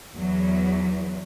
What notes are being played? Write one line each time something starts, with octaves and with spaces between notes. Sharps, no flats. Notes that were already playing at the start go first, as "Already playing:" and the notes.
E2 F#3